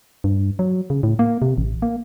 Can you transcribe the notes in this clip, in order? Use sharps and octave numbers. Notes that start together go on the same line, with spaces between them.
G2
F#3
C#3
A2
A#3
C3
A1
A#3